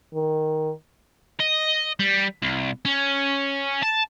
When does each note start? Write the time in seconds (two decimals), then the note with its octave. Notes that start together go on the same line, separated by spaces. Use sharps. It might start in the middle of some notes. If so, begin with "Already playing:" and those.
0.14 D#3
1.40 D#5
2.00 G3
2.43 C2
2.85 C#4
3.83 A5